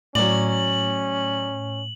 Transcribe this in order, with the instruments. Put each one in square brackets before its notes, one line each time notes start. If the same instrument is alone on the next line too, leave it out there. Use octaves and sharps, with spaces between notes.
[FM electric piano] A2 [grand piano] F#3 D5 [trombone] C#4 [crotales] F#7